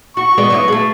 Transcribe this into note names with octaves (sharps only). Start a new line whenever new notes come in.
F#4 C#6
G#3 B3 D5
F#3 B3 E4
A3 G#4